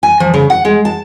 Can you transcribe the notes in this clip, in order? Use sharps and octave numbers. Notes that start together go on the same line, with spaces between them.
G#5
F3
C#3
F#5
G#3
A5